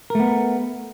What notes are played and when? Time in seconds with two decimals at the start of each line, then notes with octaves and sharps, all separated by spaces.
0.10 A#4
0.15 A3
0.20 B3